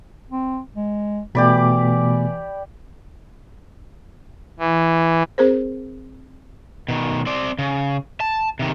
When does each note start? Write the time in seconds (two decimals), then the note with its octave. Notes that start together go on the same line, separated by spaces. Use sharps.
0.31 C4
0.76 G#3
1.35 B2 E3 A3 B3 G4 D5 B5
4.59 E3
5.38 C4 G#4 A#4 C5
6.88 B2 D#3
7.26 C4 D5
7.59 C#3
8.20 A5
8.59 C3 D#3